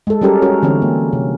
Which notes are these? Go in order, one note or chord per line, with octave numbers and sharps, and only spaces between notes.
G#3 A4
F#3 G3 C#4 G4 A4 A#4
C#4 F#4 A#4
D3 E3 C4 C#4
A#3
C3